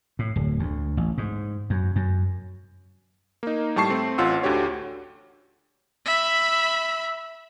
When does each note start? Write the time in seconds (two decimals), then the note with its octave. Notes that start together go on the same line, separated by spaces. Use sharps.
0.19 A2
0.36 D1
0.59 D2
0.97 A1
1.18 G#2
1.70 F#2
1.96 F#2
3.43 A#3 D#4
3.76 A2 G3 A5 C#6 C7
3.90 A3 C4
4.18 A1 C#4 F4 C5 F#5 E6
4.43 D2 D3 F#4 G4 C#5
6.05 E5 B5